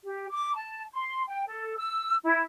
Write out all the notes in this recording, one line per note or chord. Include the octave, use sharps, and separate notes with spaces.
G4
D6
A5
C6
G5
A4
E6
E4